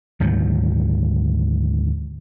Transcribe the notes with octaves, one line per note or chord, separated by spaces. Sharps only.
D2 G#2 D#3 F#3